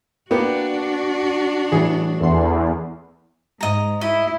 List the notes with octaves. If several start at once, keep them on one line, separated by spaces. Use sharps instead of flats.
A#3 B3 D4 F#4 G4
A2 E3 G3 G#4
E2 A4 C6
G#2 D#5 A#5
E4 D#5